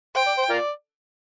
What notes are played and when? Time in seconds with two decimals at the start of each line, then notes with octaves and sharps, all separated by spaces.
0.16 C5 G5
0.27 D5
0.38 C5
0.50 F4 A#4 D5